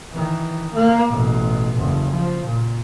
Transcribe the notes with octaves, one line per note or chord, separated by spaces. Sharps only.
D#3 E3
A#3
A1 B2
F#1 E2
F3
A#2